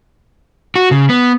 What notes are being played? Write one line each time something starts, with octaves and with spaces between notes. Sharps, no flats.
F#4
C#3
B3